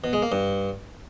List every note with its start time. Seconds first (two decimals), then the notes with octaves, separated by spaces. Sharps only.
0.04 B2
0.13 G#3
0.22 A#3
0.32 G2